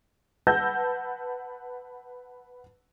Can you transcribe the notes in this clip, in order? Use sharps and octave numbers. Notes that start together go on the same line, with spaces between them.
B4 F#5 A5 E6 G6 A#6